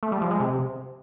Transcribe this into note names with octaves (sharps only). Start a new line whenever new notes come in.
A3
G3
F3
G#3
C3